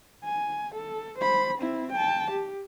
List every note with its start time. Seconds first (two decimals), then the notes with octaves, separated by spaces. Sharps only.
0.25 G#5
0.74 A4
1.19 C5 B5
1.58 C4 E4
1.92 G5 A5
2.31 G4